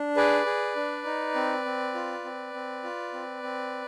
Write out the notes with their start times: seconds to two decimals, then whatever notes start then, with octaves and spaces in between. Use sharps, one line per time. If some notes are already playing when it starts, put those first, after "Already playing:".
Already playing: D4
0.16 G#4 B4 D5
0.46 G#4
0.76 D4
1.05 D#4
1.35 C4
1.65 C4
1.95 F4
2.25 C4
2.54 C4
2.84 F4
3.14 C4
3.43 C4